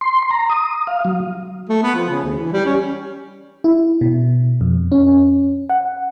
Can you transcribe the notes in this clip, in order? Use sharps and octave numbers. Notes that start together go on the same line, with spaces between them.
C6
A#5
D#6
F5
F#3
A3
B3
F3
C#3
D2
E3
G3
C#4
E4
B2
F2
C#4
F#5